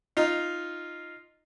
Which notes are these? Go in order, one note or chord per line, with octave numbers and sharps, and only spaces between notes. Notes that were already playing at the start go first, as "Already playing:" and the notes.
D#4 F4